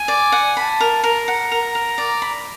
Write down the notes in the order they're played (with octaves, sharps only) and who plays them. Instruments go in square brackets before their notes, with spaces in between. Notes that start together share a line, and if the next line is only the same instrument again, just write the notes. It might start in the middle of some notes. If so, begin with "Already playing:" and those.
Already playing: [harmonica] G#5
[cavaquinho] D5
F#5
[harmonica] A5 [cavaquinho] B5
[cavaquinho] A#4
[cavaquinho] A#4 [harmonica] A#5
[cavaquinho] F#5
A#4
A#4
D5
B5